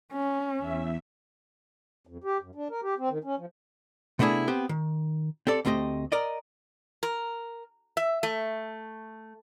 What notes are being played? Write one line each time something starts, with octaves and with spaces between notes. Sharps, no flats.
C#4
E2 E5
F2
G4
F#2
D4
A#4
G4
C4
D#3
C#4
F3
C3 A3 B3 D4 E4 G#4
B3 C4 G4
D#3
C4 G4 A4 D5
D2 A3 C4 G4 D#5
A#4 D5 D#5
A#4
E5
A3